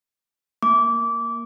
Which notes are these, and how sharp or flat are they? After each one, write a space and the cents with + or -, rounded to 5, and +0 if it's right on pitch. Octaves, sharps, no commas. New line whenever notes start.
A#3 +0 D6 -20